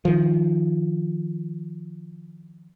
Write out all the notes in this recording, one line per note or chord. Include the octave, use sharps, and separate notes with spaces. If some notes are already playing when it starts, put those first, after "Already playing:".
D#3 F3